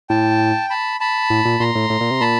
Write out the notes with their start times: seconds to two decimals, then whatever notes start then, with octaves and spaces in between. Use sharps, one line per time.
0.10 A2 G5 A5
0.70 A5 B5
1.00 A5 B5
1.30 A2
1.45 A#2
1.60 A#2 A#5 C6
1.75 A2
1.90 A2
2.01 A#2
2.11 C3
2.20 A#2 A5 B5